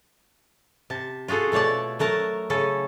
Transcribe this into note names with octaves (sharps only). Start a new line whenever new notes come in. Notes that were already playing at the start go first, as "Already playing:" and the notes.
C3 A5
F4 F#4 G#4 A4 F#5
B2 A3 C#5 D5 A5
F#3 A3 A#4 A5
C#3 C#4 A4